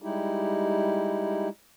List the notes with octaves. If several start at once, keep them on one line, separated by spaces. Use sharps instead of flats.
G3 G#3 D#4 E4 G4